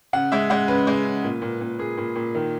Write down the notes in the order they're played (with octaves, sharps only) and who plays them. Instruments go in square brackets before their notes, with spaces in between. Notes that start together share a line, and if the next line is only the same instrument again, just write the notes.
[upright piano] C#3 F#5
G#3 E5
G#3 F#5
C#3 B4
G#3
C#3
A#2
A#2
A#2
A#2 G#4
A#2
A#2
D#3